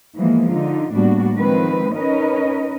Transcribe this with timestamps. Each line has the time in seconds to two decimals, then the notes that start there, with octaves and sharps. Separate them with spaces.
0.16 E3 F3 G#3 A#3 B3
0.50 D3 D#4 F4
0.93 A2 G3 A#3 B3 D4 F#4
1.37 D#3 F3 G#3 C4 B4
1.94 C#4 D#4 A#4 B4 D#5